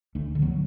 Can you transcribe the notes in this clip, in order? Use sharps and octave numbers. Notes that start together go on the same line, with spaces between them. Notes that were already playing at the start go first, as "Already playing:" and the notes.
D2 A3 D4
D3
F#3 B3